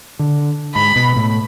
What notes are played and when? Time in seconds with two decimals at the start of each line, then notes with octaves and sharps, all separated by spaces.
0.19 D3
0.75 G#2 B5
0.96 B2
1.16 A2